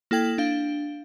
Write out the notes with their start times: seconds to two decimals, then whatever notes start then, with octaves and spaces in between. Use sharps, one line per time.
0.11 A#3 E4 A4 G5 G#6 F#7
0.38 D4 F5 G7